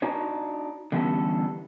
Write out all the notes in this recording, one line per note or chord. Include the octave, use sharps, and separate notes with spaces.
D4 D#4 F#4 C#5
D3 E3 G3 B3 C#4 A4